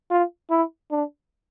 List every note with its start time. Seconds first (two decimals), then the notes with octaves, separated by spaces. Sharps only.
0.11 F4
0.50 E4
0.90 D4